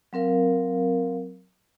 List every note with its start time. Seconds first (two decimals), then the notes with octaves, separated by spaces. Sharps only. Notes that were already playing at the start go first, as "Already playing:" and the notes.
0.13 F#3 C4 A#4 F5